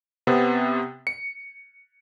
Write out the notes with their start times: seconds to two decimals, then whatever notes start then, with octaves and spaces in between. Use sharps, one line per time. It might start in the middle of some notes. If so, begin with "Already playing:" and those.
0.27 C3 B3 C4
1.07 C#7